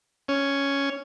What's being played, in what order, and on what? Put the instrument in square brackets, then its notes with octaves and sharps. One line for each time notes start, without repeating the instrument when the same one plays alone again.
[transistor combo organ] C#4